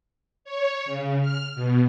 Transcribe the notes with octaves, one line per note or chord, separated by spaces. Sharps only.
C#5
C#3
F6
B2